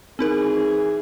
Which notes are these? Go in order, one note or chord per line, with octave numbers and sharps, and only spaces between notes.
E3 C4 D#4 G#4 A#4